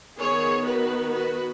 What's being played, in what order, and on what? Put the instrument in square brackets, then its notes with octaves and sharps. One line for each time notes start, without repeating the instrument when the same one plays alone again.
[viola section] D#3 B3 G#4 C#5
F#4 B4
F#4 B4